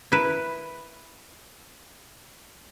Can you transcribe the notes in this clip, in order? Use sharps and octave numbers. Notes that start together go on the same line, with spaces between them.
E4 A#4 B4